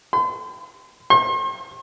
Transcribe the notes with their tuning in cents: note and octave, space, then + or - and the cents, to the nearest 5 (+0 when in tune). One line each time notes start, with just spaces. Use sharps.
C6 -45
C6 +45